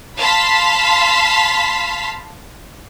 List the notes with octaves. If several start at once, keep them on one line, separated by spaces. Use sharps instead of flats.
F5 A5 B5 C6 B6